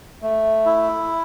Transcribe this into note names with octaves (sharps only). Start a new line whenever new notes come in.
A3
E4